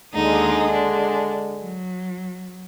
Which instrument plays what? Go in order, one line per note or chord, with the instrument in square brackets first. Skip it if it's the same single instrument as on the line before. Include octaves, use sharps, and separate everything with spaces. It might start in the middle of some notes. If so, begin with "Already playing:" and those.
[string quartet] D#2 D#4 D#6 [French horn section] D3 G#3
[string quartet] D4
F#3